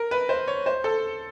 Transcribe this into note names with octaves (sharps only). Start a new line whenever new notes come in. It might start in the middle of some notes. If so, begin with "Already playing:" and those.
Already playing: A#4
B4
C5
C#5
C5
A4